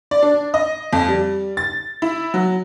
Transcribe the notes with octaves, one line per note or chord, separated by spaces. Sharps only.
D5
D4
D#5
F2
G3
A6
E4
F#3